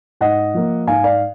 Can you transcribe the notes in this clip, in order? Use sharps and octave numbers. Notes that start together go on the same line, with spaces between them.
G#2 D#5 F#5
F3 A#3
G#2 F5 G#5
D5 F5